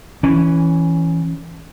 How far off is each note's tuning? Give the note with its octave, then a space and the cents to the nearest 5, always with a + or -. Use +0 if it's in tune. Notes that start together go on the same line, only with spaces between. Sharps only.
E3 +0 C#4 +0